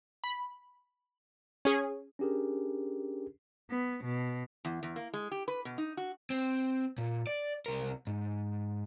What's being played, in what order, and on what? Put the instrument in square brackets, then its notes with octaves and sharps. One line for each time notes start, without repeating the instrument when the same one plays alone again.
[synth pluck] B5
C#4 G#4
[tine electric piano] C#4 D4 G4 G#4 A#4
[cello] B3
B2
[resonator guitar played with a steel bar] E2
E2
A#3
G#3
G4
B4
B2
D#4
F#4
[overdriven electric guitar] C4
A#2
D5
C2 A#4
G#2